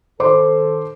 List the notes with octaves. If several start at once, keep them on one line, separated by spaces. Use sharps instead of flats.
D#3 A4 C5 C6 D6